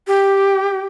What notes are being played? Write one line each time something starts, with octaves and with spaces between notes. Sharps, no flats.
G4